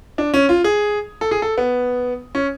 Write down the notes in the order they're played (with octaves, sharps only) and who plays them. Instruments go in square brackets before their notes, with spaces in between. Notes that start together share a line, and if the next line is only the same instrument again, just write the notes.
[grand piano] D4
C#4
F4
G#4
A4
G#4
A4
B3
C#4